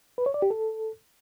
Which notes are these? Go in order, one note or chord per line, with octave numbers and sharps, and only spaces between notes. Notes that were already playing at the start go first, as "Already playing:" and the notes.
B4
C#5
D5
G4
A4